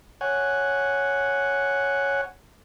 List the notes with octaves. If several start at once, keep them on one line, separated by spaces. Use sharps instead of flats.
C#5 F#5 G#5